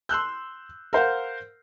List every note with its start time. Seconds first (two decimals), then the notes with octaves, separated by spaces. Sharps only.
0.09 C6 E6 F#6 G6
0.93 A#4 C5 F5 F#5